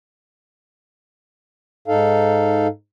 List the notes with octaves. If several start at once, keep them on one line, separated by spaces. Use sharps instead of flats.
G#2 D#4 A4 F5